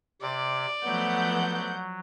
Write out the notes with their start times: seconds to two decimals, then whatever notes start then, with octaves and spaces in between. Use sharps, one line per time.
0.22 C3 D5
0.85 F3 F#3 A3 B3 F#5 G6